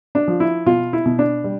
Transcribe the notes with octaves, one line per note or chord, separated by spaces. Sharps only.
D4
F3
E4
B2 F4
E4
B2
D4
G3